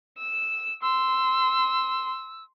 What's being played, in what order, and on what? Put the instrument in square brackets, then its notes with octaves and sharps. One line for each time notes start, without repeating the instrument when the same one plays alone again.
[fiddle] E6
[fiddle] C6 [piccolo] E6